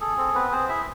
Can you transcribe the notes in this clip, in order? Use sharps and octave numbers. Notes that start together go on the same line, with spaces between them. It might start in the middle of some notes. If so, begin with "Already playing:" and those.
G#4 A4
C4 A4
B3 C4 B4
C4 G#4 C5
E4 G#4 E5